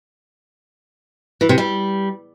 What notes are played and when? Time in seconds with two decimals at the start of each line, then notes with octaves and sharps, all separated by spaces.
1.41 E3
1.49 C3
1.58 G3